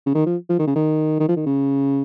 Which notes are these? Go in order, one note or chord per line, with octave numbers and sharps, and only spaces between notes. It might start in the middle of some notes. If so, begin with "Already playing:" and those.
C#3
D#3
F3
F3
D#3
C#3
D#3
D#3
F3
D#3
C#3